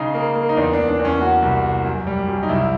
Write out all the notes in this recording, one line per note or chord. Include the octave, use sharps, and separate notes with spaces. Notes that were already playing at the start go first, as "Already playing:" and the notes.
Already playing: C#3 D#4
A#3
A#3
D#4
E2 D4
D4
E2
D4
E2
C#4
A#3 F#4
C2
A#3
F#2
G3
F#2
D#4
C2 E4